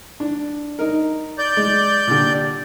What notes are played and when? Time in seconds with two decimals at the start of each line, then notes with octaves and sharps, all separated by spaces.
0.20 D4
0.79 D#4 A#4
1.38 D5 G6
1.57 G#3
2.07 A#2 D3 G4